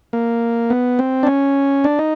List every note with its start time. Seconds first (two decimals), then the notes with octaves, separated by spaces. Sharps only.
0.13 A#3
0.70 B3
0.99 C4
1.23 D4
1.27 C#4
1.84 D4
1.99 D#4